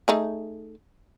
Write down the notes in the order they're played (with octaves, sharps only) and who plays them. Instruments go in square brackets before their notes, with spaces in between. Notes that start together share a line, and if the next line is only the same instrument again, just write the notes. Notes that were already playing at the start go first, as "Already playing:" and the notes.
[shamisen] A3 D#4 G#4